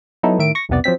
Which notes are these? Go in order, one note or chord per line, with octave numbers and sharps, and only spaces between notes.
F#3 B3 D#4 E4 A4
A2 D#3 E5 D7
C#6 A#6
B1 E2 C3 B3 D5
F3 F#3 C4 B6